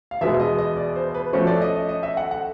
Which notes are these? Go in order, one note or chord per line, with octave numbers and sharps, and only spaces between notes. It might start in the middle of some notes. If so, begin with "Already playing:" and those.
F5
E2 B2 G#3 E5
D#5
D#5
D5
C5
B4
F3 A3 C#4 F#4
D5
D#5
D#5
D#5
E5
F#5
F#5